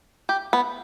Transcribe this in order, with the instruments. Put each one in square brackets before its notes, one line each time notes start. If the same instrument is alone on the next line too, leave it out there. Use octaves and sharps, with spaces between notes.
[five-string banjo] G4
B3